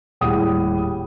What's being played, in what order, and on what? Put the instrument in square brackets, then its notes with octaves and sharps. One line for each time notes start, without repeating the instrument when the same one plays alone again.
[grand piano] D#1 A2 G3 G#4 F#5 D#6